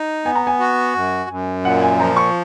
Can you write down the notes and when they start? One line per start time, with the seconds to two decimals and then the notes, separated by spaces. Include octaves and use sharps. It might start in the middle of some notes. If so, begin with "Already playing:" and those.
Already playing: D#4
0.25 B3 G#5
0.35 A#5
0.47 G#5
0.60 F#4
0.95 F#2
1.30 F#2
1.64 A#2 F#5
1.81 G#5
1.99 F3 A#5
2.17 C#6